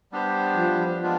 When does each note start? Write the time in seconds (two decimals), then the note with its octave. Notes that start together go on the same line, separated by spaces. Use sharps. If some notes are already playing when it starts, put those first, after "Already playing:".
0.12 G3 B3 D4 G4 C5
0.57 F3
1.02 G#3 B3 D4 F4